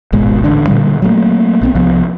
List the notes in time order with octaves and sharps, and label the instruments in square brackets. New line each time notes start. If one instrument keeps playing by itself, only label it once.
[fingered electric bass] D#1 G#1 B2 G#3
A1 D3 D4
A#2 D3 G3
F#3 A3 A#3
A#1 B3 C4
C2 F3 B3